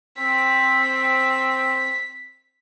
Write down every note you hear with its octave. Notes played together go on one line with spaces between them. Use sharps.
C4 B6